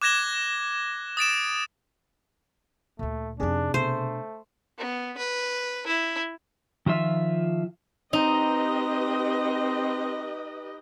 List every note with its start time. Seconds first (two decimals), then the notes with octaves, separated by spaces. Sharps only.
0.02 D6 F#6 G#6 A#6 E7 G7
1.17 D#6 A6 D7 E7
2.99 D2 A#2 A3
3.40 F2 C3 D4 D#4 G#4
3.74 B2 A3 D4 C5
4.78 B3
5.17 B4
5.87 E4
6.86 D#3 F3 F4 E5
8.13 C4 D#4 G4 B4 D#5